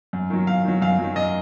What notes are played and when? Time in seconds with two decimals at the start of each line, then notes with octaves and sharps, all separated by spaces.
0.13 F#2
0.30 D#3 F#3
0.47 F#2 F5
0.65 D#3 F#3
0.82 F#2 F5
0.99 D#3 F#3
1.16 F#2 D#5